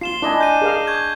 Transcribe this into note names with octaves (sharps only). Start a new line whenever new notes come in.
F4 C7 E7 G7
D4 E4 D#5 G#5
G6 D#7
G#4 A#4 F5
C#6 G6 G#6